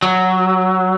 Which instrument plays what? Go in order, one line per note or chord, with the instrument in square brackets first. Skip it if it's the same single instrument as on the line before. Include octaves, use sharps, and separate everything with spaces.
[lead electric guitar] F#3